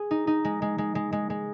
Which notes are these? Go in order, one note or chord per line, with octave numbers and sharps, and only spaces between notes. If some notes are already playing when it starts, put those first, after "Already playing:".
Already playing: G#4
D#4
D#4
G#3
G#3
G#3
G#3
G#3
G#3